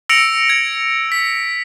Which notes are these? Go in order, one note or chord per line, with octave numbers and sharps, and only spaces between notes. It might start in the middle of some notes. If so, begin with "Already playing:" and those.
E6 A#6 C#7 D7 F7
G#6
B6